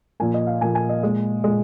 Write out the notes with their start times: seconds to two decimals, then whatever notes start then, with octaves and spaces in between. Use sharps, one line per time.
0.20 A#2 F3 A#3 G#5
0.34 D#5
0.47 F5
0.61 A#2 F3 A#3 G#5
0.75 G#5
0.89 D#5
1.03 A#2 G#3
1.44 A#2 G#3